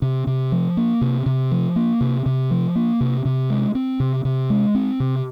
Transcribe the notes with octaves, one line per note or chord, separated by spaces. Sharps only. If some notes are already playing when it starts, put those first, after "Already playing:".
C3
C3
F3
A#3
C3
C3
F3
A#3
C3
C3
F3
A#3
C3
C3
G#3
C4
C3
C3
G#3
C4
C3